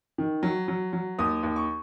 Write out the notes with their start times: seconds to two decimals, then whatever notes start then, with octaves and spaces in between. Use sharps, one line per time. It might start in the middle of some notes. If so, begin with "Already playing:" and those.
0.18 D#3
0.43 F#3
0.68 F#3
0.93 F#3
1.19 D#2 D#6
1.43 D#2
1.56 C#6